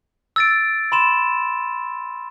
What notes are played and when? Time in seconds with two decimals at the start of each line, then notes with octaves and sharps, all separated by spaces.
0.36 E6 A6 D7
0.92 B5 C6 E7